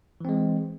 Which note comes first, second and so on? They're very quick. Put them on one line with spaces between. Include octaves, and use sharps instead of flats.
E3 C4 G#3